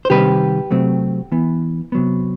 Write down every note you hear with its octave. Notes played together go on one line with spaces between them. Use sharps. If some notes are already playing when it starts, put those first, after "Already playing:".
C5
C3 D#3 G3 C4 G4 B4
C3 F#3 A3 C4
E3 B3
C3 F#3 B3